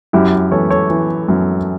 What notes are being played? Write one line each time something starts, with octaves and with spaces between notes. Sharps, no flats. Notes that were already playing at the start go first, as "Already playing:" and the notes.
F#2 E4 G4
E3 A4 C#5
A4 C#5
E3
F#2